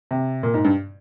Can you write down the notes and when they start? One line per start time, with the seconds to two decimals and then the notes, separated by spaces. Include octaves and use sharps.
0.11 C3
0.43 A#2
0.54 G#2
0.65 G2